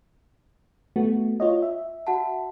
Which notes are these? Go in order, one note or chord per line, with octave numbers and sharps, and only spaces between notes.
A3 B3 F#4
F4 C#5 D#5
E5
F#4 F#5 A5